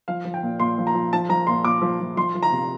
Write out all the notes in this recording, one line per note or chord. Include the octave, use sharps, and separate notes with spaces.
F3 F5
F3
G5
A#2
A#2 C6
F3
A#5
F3
F3 A5
F3 A#5
A#2 C6
A#2 D6
F3
F3
F3 C6
F3
A#5
C3